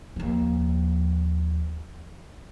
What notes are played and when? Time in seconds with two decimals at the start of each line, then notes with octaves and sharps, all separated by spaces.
0.16 D#2 F3